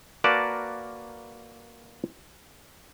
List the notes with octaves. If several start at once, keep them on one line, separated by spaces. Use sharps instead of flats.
A#3 F#4 A#4 B4 D5 A5